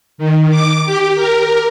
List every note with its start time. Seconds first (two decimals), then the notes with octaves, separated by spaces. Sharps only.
0.18 D#3
0.50 D6
0.86 G4
1.15 A#4